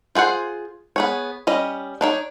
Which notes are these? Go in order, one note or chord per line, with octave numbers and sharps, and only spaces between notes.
F4 G#4 C5 F#5
B3 G#4 C#5
G3 C#4 D#5
D4 D#4 C#5